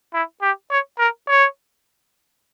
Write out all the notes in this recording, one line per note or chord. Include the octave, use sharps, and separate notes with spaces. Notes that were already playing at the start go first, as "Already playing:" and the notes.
E4
G4
C#5
A#4
C#5